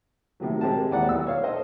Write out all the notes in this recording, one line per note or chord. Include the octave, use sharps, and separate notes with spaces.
A2 C3 D#3 F#3
G#3 C4 G4 A#4 A5
D#2 E4 D5 F#5 A#5
B1 E6
C#5 F5
A4 C5 D#5